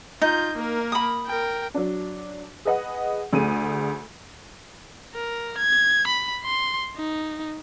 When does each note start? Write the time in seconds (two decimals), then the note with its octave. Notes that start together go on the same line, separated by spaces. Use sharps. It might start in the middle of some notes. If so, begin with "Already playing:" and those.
0.22 D#4 F4 G6
0.56 A#3 A#4
0.92 B5 D#6
1.26 A#4 G5
1.74 F#3 D4
2.65 G#4 B4 D#5 F#5
3.33 D2 A3 G#4 D#7
5.15 A#4
5.58 G#6
6.07 B5
6.44 C6
6.97 D#4